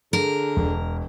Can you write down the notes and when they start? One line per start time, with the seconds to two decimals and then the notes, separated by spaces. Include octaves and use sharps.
0.13 D3 G#4 A#4
0.57 E1